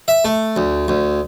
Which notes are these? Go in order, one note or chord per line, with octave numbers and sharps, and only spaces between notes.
E5
A3
D2
D2